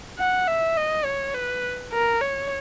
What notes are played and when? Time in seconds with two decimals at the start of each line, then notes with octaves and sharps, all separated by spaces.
0.19 F#5
0.47 E5
0.77 D#5
1.05 C#5
1.34 B4
1.93 A#4
2.21 C#5